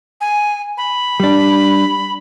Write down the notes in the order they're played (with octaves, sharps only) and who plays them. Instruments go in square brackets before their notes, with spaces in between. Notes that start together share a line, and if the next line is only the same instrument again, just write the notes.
[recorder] G#5
B5
[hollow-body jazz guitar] G3 D4